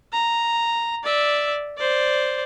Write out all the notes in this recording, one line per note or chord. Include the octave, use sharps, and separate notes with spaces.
A#5
D5 E5
C5 D5